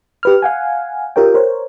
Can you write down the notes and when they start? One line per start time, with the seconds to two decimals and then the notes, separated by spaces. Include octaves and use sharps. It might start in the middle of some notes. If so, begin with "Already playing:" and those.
0.23 G4 B4 F6
0.42 F5 F#5 G#5
1.16 F4 G4 A#4 C#5 G5
1.34 A#4 C5 C#5